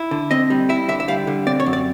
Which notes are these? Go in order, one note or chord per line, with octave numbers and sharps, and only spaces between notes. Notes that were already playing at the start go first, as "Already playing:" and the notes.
Already playing: E4
D3
C4 D#5
G3
E4 E5
D3 E5
E5
G3 F5
D3
C4 D5
C#5
F#2
D5